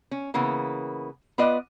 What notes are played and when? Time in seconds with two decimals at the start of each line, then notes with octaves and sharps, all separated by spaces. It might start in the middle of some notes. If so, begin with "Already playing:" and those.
0.11 C#4
0.34 C#3 E3 A#3 B3
1.38 B3 F4 B4 D5 D#5